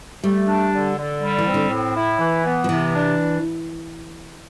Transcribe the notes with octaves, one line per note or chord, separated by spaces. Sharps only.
G3 A3
D4
D3
D3
G3
E3
C4
D3
A2
E4
E3
B3
F3
C3 E3
D4